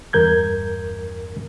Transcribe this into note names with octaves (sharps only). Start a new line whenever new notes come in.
E2 G2 A#4 G6 G#6